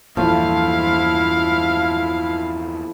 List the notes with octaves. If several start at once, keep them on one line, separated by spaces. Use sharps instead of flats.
E2 G2 A#2 F3 A3 E4 F5